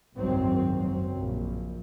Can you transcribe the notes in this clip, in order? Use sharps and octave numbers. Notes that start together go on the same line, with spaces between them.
F#1 C2 G#2 D#3 F#3 C4
F#1 F#3 C4
A#1